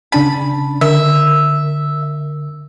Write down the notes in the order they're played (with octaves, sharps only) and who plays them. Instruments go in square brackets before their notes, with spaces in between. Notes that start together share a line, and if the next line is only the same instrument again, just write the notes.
[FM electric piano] C#3 D4 A5 [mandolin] B5
[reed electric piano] D3 [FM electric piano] A#4 [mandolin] E5